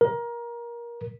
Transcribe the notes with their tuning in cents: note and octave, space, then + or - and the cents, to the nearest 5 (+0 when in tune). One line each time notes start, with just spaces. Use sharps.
A#4 +20